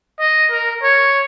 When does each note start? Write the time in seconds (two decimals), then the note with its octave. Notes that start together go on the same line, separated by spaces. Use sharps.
0.20 D#5
0.51 A#4
0.83 C#5